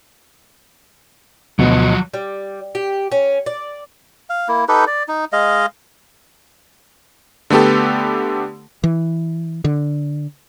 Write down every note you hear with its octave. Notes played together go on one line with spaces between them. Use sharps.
D2 B2 F3 F#3 D#5
G3
G4
C#4
D5
F5
A#3 E4
D#4 G4 A4 B4
D5
D#4
G#3 D#5 F5
D3 A3 B3 G4 A4
E3
D3